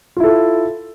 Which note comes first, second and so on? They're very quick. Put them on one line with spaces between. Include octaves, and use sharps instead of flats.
F4 E4 A4